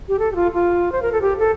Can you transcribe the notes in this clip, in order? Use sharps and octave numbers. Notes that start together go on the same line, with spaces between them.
G4
A4
G4
F4
F4
C5
A#4
A4
G4
A4